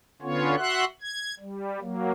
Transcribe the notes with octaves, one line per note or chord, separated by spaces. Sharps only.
D3 B3 C#4 F4 C#5
F#4 E5 F#5 C6 F#6
G#6
G3
F#3 A#3